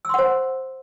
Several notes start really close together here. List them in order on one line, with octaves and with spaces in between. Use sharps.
E6 C6 F#5 C5